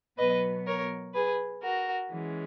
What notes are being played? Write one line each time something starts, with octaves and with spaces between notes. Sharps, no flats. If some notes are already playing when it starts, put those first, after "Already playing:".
B2 F#3 B3 B4 D#5
A#4 C#5
G#4 B4
F#4 A#4
E3 G#3 C#4